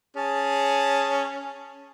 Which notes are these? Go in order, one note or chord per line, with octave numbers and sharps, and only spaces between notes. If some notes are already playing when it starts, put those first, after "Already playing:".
C#4 G#4 A5